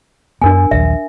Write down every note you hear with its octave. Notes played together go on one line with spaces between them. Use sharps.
F#2 B3 D4 A#4 G#5
A#1 D#2 F#3 E5